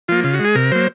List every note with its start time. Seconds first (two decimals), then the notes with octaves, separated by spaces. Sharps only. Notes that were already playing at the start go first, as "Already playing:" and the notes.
0.08 F3 A#3 F4
0.24 C#3 F4
0.34 F#4
0.40 G#3 G#4
0.55 C3 A#4
0.71 F#3 A#3 C5